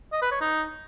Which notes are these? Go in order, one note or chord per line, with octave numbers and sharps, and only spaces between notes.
D#5
B4
C#5
D#4